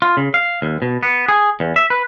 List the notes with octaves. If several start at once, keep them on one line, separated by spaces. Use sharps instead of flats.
F4
C#3
F5
D#2
B2
B3
G#4
E2
E5
B4